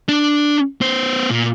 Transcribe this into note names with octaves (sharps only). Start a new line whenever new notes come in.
D4
B3 C5
A#2